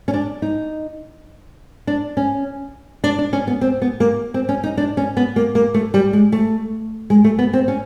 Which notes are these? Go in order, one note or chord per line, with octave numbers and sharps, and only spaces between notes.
C#4
D4
D#4
D4
C#4
D4
D4
C#4
B3
C4
B3
A#3
C4
C#4
D#4
D4
C#4
B3
A#3
A#3
A3
G3
G#3
A3
G#3
A3
B3
C4
C#4